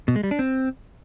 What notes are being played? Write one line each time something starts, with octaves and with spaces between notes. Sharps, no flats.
B2
G#3
G3
D4
C4